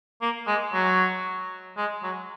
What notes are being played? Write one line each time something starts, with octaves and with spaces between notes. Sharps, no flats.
A#3
G#3
F#3
G#3
F#3